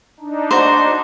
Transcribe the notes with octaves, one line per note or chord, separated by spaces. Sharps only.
D4 D#4
F#4 C5